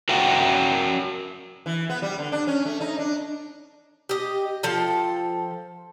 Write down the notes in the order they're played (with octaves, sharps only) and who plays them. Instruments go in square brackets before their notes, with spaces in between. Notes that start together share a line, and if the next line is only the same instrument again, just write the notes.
[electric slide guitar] F#4 A#4 E5 F#5 G5
[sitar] E3
B3
G3
D3
D4
C#4
A3
D#4
D4
[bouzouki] G4 D#5
F3 A4 G5